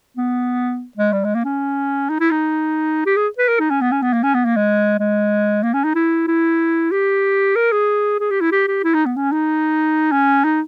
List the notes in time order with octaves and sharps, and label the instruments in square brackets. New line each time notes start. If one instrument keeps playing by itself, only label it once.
[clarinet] B3
G#3
G3
G#3
A#3
C#4
D#4
E4
D#4
G4
G#4
B4
A#4
D#4
C#4
B3
C#4
B3
A#3
C#4
B3
A#3
G#3
G#3
A#3
C#4
D#4
E4
E4
G4
A#4
G#4
G#4
G4
E4
G4
G4
E4
D#4
B3
C#4
D#4
C#4
D#4